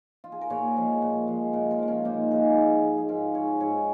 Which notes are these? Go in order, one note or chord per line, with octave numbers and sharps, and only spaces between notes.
F4
G#4
A#4
A#2 G#4 C#5
F3 G#3
A#2
F3 G#3
A#2 A#4 D#5
F4 A#4
F3 G#3
C#4 F4
A#2 A#3 D#4
F3 G#3 D#4 G#4
G#2
G#3
G#4
G#2 F4 A#4
G#3 G#4 C#5
G#2 G#4 C#5